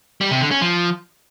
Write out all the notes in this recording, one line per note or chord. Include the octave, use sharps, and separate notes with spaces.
G3
C3
D3
C#4
F3